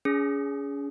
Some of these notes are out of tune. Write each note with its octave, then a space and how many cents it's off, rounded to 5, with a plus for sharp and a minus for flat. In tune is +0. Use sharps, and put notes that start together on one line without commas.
C#4 +35 G#4 +0